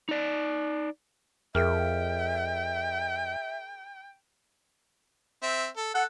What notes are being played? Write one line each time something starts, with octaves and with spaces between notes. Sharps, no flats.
D#4 D5
F2 G#4 A#4 E5 G5 F6
C4 E5
A4
A4 F#5